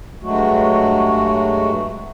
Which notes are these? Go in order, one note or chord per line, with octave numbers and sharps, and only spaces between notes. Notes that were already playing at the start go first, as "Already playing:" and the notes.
G2 F#3 G#3 A3 F#4